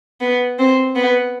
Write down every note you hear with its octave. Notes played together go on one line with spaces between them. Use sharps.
B3
C4
B3